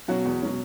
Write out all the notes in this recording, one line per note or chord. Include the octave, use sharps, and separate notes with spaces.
B2 F#3 C#4 F#4
E2
B2 F#3 C#4